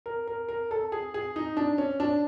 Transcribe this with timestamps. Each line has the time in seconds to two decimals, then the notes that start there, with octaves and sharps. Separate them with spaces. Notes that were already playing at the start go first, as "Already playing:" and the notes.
0.06 A#4
0.27 A#4
0.49 A#4
0.71 A4
0.92 G#4
1.14 G#4
1.36 D#4
1.57 D4
1.78 C#4
2.00 D4